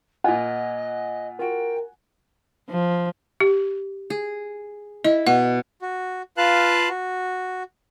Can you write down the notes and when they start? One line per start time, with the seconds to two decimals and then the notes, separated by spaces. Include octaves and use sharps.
0.24 A#2 F4 D#5 F#5 G#5
1.39 F4 F#4 A#4 G5
2.70 F3
3.40 G4
4.10 G#4
5.04 E4 D#5
5.27 B2 F#5
5.82 F#4
6.37 F4 B4 F5 A5 F#6
6.89 F#4